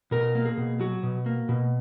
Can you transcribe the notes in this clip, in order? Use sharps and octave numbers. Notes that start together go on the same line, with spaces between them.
B2 A#4
A#3
G#4
B2
F#3 F#4
B2
A#3
B2